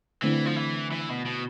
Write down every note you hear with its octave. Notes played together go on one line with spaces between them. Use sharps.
D3 E3 A3 C4 E4
F3
E3
E3
B2
B2